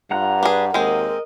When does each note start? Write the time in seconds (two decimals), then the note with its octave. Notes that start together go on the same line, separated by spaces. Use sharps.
0.11 G2 F4 F#5 A#5 F#6
0.43 D4 G#4 B4
0.74 D#2 G#3 C4 A#4 D#5